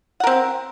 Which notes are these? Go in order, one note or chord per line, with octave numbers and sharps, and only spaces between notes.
C4 A#4 F#5